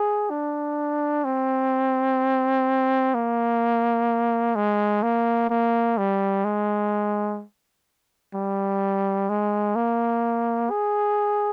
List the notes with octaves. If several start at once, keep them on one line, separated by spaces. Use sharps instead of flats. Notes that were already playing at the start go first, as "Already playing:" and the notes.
Already playing: G#4
D4
C4
A#3
G#3
A#3
A#3
G3
G#3
G3
G#3
A#3
G#4